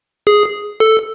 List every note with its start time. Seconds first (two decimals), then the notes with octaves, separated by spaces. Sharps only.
0.27 G#4
0.80 A4